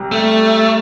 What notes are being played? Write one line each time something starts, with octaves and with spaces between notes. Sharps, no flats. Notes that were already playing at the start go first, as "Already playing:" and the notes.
Already playing: C2 C3 G3
A3